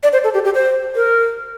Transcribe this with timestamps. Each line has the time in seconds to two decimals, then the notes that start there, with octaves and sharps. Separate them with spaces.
0.03 D5
0.13 C5
0.24 A4
0.34 G4
0.45 G4
0.54 C5
0.96 A#4